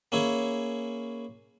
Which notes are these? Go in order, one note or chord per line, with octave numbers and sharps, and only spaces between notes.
A#3 C#4 E4 G#4